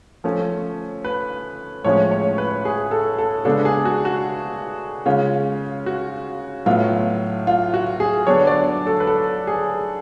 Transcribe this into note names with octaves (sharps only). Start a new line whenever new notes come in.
F3 A3 C#4
B4
A2 F3 G#3 C#4 C#5
C#5
B4
G#4
A4
A4
C#3 G#3 B3 D4 A4
G#4
F#4
F#4
C#3 G#3 C#4 F4
F#4
A2 F#3 B3 F4
F4
F#4
G#4
D3 F#3 B3 D4 C#5
D5
A4
B4
A4
G#4